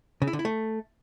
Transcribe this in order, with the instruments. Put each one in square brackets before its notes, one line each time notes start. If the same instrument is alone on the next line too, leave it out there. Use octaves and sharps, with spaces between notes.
[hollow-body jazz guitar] C#3
E4
D3
E4
A3